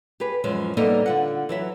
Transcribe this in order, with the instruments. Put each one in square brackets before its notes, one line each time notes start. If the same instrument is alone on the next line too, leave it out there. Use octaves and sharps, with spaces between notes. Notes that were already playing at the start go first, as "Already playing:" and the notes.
[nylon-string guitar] G4 G#4 B4
F#2 E3 F3 G#3
G3 A#3 B3 D#4 A4 D#5
D3 F4 F#5
E3 F#3 E5